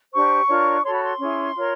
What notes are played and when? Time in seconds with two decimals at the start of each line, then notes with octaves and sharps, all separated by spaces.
0.13 D4 G4 C5 C#6
0.48 D4 F4 A#4 C#5
0.84 F#4 A4 C#5 C6
0.94 B5
1.04 C6
1.19 C#4 E4 G#4
1.55 F4 A#4 C#5